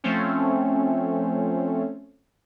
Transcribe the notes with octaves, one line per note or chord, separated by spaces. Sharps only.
F3 A3 C4 C#4